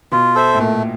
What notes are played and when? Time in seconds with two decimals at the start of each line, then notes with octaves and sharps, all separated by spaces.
0.12 B2 F4
0.35 A4 C5 E5
0.55 A2
0.59 A#2 A3